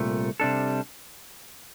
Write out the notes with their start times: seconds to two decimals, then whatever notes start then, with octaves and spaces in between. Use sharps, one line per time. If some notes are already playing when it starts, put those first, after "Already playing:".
Already playing: C2 A#2 A3
0.40 C3 G3 D4 A4